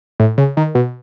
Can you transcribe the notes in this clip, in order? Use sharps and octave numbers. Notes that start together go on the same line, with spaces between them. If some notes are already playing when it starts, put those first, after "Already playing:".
A2
C#3
D#3
B2